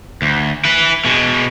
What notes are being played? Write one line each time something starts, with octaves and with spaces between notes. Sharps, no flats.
D2
E4 B4
B2 G#3